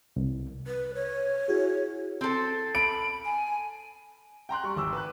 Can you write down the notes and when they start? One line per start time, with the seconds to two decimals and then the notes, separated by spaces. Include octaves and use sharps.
0.16 C2
0.67 B4
0.95 C#5
1.48 E4 F#4 G#4
2.21 C4 A4
2.75 B5 D7
3.25 G#5
4.49 G5 A#5 C6 F#6
4.63 G3 C#6
4.76 G#1 D6 E6
4.93 B4 F#6